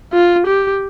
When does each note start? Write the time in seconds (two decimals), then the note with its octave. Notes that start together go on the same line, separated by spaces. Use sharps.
0.13 F4
0.46 G4